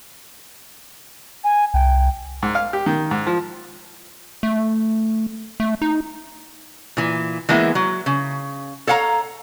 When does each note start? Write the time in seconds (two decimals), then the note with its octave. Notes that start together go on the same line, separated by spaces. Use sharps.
1.44 G#5
1.74 C2 G5
2.43 G#2
2.55 F5
2.73 G4
2.86 D#3
3.11 G#2
3.27 F3
4.43 A3
5.60 A3
5.82 D#4
6.97 A#2 E3
7.49 E3 G#3 A#3 B3 E4
7.75 F#3
8.06 C#3
8.87 A4 C#5 F5 F#5 A#5